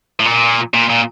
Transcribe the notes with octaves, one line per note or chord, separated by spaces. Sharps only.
A2
A#2
A#2
A#2